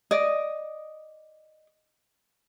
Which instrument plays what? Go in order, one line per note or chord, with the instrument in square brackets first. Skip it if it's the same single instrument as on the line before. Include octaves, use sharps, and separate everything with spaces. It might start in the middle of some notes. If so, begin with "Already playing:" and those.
[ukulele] D5 D#5